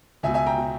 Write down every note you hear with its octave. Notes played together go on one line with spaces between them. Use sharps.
C#2 B2 E5 G#5
E5 G#5
G5 A#5
B2